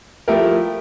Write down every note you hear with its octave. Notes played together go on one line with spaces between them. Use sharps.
F3 A3 E4 G4 A#4